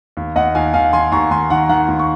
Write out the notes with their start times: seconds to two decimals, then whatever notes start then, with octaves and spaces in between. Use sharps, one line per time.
0.17 D#2
0.36 D#2 D#5 F#5
0.55 D#2 F5 G#5
0.73 D#2 F5 G#5
0.93 D#3 G#5 C6
1.12 D#2 A#5 C#6
1.31 D#2 G#5 C6
1.50 D#3 F#5 A#5
1.69 D#3 F#5 A#5
1.88 D#2
1.99 C#6